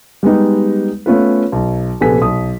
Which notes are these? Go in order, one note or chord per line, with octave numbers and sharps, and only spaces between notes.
G3 G#3 B3 D#4 G4
A3 B3 C#4 F4 B4
B1
A#1 C3 B3 A4 G#5 B6
B1 D#6